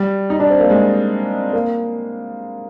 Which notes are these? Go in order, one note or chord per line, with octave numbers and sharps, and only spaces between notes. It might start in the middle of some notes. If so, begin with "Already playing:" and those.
Already playing: G3
D#4
D4
C4
A#3
G#3
A#3